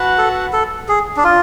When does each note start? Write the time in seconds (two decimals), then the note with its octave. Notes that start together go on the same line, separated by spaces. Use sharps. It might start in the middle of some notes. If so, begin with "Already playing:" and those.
Already playing: F#4 B4 F#5 A5
0.18 A4
0.53 A4
0.89 G#4
1.17 D4
1.24 F4